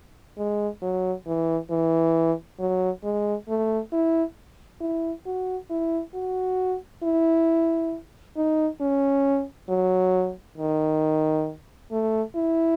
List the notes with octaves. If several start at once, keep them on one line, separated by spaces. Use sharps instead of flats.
G#3
F#3
E3
E3
F#3
G#3
A3
E4
E4
F#4
E4
F#4
E4
D#4
C#4
F#3
D#3
A3
E4